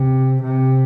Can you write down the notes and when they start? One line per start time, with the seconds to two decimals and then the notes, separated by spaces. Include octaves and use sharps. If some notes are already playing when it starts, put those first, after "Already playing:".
Already playing: C3
0.43 C3